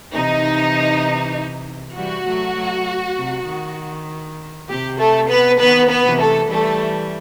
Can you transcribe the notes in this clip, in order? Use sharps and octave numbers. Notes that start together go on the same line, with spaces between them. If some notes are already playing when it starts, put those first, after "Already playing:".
C3 E3 D#4
E3 G3 F#4
F#3 A3
F#3 A3
C3
D#3
C3 G4
A3 A4
B3 B4
D#3 B3 B4
B3 B4
C3 E3
A3 A4
E3 G3 A3 A4